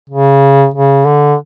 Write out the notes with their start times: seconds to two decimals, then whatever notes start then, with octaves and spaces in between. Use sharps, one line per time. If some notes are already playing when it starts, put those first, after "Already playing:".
0.10 C#3
0.74 C#3
1.06 D3